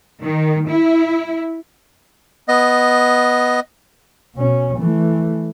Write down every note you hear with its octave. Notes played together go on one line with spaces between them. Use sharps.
D#3
E4
B3 D#5
B2 C#4
E3 A3